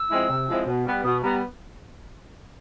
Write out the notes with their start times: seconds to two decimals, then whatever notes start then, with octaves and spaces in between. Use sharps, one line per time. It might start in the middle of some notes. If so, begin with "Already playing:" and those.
Already playing: E6
0.11 F3 G#3 C4 E4
0.30 C3
0.49 F3 G#3 C4 E4
0.66 B2
0.85 G3 B3
1.04 B2 D#6
1.22 G3 B3 A#5